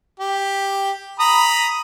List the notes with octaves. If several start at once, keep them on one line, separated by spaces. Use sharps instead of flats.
G4
A#5 B5 D#6